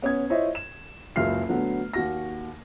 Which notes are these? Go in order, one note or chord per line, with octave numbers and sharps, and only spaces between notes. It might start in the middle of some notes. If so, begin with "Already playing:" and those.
B3 C#4 D#6 G#6
E4 F4 C5 C#5 D#5 E5
E7
F#1 C#2 F#2 E5 F6 C7
D3 F#3 A3 B3
D#2 F#4 A#6